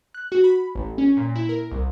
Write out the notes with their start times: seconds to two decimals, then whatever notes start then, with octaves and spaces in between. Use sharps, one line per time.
0.14 F#6
0.32 F#4
0.44 B5
0.75 A1
0.98 C#4
1.17 A#2
1.35 E4
1.49 A#4
1.72 C2